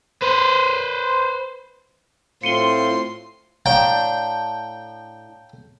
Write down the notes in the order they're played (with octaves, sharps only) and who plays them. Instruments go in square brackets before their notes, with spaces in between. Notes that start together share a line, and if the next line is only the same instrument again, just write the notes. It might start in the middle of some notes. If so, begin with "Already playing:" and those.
[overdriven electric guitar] B4 C5
[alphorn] A2 [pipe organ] C4 F4 [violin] C6 [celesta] C#7 D#7 G7
[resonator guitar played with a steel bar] A2 D4 [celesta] C#5 F5 A#5 [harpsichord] G5